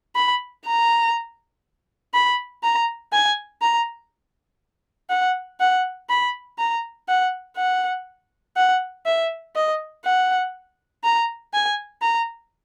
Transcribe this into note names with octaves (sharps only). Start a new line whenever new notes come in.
B5
A#5
B5
A#5
G#5
A#5
F#5
F#5
B5
A#5
F#5
F#5
F#5
E5
D#5
F#5
A#5
G#5
A#5